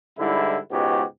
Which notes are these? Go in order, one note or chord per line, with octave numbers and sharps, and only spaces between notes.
G#2 D3 G3 E4
C#2 G#2 B2 F#4 G4